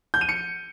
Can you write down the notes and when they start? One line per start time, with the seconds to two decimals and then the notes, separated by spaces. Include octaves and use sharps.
0.14 G6
0.21 D#7
0.29 C#7